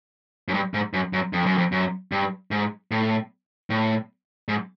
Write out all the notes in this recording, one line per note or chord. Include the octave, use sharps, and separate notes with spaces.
F#2
G2
G#2
F#2
F#2
F2
F#2
F2
F#2
G2
G#2
A2
A2
G#2